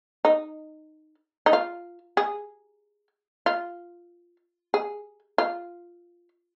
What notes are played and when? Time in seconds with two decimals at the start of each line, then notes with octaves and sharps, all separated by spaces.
0.25 D#4
1.46 D#4
1.53 F4
2.17 G#4
3.46 F4
4.74 G#4
5.38 F4